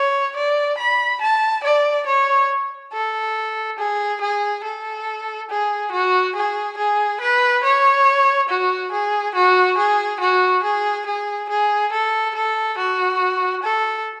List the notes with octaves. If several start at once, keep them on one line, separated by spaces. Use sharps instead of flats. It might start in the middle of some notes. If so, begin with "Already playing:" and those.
Already playing: C#5
D5
B5
A5
D5
C#5
A4
G#4
G#4
A4
G#4
F#4
G#4
G#4
B4
C#5
F#4
G#4
F#4
G#4
F#4
G#4
G#4
G#4
A4
A4
F#4
A4